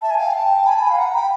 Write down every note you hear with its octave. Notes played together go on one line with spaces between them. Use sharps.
E5 A5
G#5
F5 G5
G5 A5
G5
G#5 B5
A5
G#5
F5
F#5 A#5
G5 B5